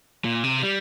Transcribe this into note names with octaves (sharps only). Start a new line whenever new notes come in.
A#2
C3
G3